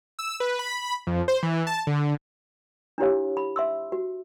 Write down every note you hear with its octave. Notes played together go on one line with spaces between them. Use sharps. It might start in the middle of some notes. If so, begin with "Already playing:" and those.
E6
B4
B5
F2
C5
E3
A5
D3
D4 E4 F4 G4 C#5 F5
B5
E5 C6 E6
F#4